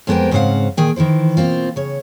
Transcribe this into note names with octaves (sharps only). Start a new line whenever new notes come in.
F2 G#3 B3 A#4 C5 G5
G#2 C#3 C4 C5 F5 F#5
A#2 D#3 G#4 G5
D#3 E3 E4 C5
B2 A#3 C4 F4
C#3 C#5